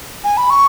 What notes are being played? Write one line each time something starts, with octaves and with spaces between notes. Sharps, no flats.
G#5
B5
C#6